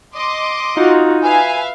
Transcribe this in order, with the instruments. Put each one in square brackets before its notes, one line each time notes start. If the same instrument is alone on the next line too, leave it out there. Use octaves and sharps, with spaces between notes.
[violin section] D#5 C6 D6
[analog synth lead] D#4 [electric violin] F4 F#4
[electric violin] B4 [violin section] E5 F5 [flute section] G#5